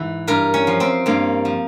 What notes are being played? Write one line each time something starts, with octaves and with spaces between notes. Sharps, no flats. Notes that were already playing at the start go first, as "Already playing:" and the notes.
Already playing: G#2 E3
G2 A#4
C#4
F3
C4
G2 A#3
F3